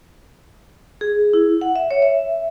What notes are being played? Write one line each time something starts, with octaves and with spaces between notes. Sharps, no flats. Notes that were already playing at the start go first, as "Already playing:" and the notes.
G#4
E4
F#5
E5
C#5
E5